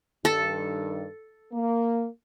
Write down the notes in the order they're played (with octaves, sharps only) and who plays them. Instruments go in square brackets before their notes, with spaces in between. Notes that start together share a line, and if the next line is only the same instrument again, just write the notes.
[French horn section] G2 D#3 [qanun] A4
[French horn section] A#3